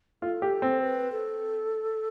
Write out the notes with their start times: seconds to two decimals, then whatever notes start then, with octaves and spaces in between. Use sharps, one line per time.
0.22 F4 A4
0.42 G4
0.62 C4
0.82 B4
1.12 A4